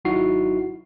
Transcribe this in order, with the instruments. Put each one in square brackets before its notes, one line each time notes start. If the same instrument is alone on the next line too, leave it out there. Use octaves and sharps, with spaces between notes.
[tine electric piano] G#1 F#3 D#4 E4 F#4 C7